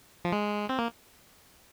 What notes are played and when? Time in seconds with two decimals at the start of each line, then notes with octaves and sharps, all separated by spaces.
0.25 F3
0.32 G#3
0.69 C4
0.79 A#3